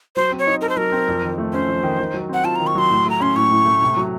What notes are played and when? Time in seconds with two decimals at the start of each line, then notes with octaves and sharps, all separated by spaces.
0.16 F#3 C5
0.32 C4
0.39 C#5
0.47 D#4
0.61 A4 A#4
0.69 C5
0.77 F#3 A#4
0.92 C4
1.08 F2
1.23 D#3
1.38 A3
1.53 C#4 C5
1.68 F2
1.83 D#3
1.99 D#3
2.14 F#3
2.29 C4 F#5
2.44 F4 A5
2.56 A#5
2.60 D#3
2.67 C#6
2.75 F#3 C6
2.90 A2
3.06 A3 A#5
3.20 C#4 C6
3.36 A2 C#6
3.51 A2
3.66 A3
3.82 C3
3.97 F#3